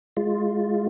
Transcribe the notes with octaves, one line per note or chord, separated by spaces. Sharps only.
G#3 F4